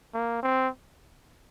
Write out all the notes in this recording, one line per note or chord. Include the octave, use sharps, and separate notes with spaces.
A#3
C4